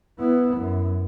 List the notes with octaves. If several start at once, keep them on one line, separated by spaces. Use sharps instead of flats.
B3 E4
F#2